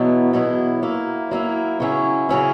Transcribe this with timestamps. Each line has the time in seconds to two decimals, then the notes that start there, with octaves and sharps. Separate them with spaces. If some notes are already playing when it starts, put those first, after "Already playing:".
Already playing: E2 B2 F#3 B3 E4
0.33 E2 B2 F#3 B3 E4
0.82 F#3 A#3 E4
1.31 F#3 A#3 E4
1.80 C#3 F#3 C#4 E4
2.29 C#3 F#3 C#4 E4